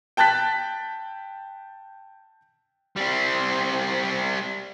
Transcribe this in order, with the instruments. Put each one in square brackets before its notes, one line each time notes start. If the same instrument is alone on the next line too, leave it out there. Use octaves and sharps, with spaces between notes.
[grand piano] G5 A5 F#6 A6 B6
[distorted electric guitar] G3 C4